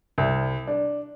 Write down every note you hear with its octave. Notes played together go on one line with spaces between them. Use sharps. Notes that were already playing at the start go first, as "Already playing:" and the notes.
C2
D4